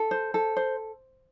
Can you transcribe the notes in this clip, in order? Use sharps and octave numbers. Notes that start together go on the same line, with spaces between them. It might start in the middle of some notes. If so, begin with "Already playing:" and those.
Already playing: A4
C5
A4
C5